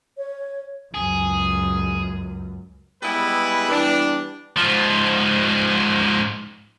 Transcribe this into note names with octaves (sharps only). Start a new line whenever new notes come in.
C#5
C#2 F#2 G#4
G3 G#3 B3 E4 G#4 B4
E3 G3 B3 D4
G#2 F3